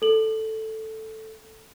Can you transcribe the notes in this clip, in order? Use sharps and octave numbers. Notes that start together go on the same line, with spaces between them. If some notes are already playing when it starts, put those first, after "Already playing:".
A4 F#7